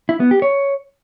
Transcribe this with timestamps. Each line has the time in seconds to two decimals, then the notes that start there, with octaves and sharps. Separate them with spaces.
0.09 E4
0.20 B3
0.31 G4
0.42 C#5